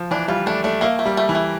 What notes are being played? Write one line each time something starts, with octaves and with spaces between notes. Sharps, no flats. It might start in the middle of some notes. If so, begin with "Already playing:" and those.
Already playing: F3
E3 D4
G3 F4
A3 D4
A3 D4
A3 A#3
A3
G3
A3
E3
A3